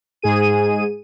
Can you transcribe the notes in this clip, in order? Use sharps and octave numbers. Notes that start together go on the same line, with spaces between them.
G#2 G#4 D#7